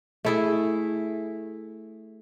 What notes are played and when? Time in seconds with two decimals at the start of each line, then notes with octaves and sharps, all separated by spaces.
0.25 A3 E4 G#4